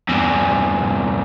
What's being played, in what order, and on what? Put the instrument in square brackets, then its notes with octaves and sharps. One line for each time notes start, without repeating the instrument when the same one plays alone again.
[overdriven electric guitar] E2 G2